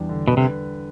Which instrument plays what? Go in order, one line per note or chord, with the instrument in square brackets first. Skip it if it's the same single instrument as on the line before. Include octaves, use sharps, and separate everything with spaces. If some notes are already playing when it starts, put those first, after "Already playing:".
Already playing: [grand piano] E2 G3 D4
D3
[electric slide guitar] B2 [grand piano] B4
[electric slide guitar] C3